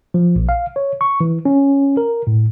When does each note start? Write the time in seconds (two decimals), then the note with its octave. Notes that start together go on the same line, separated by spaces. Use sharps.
0.14 F3
0.36 A#1
0.49 F5
0.76 C#5
1.01 C#6
1.21 E3
1.45 C#4
1.97 A#4
2.27 A2